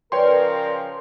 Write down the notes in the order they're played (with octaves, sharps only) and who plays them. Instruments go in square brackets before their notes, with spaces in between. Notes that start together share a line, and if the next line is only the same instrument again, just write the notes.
[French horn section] C#3 F3 A#4 [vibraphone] B4 D5 [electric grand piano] C#5 G5 C6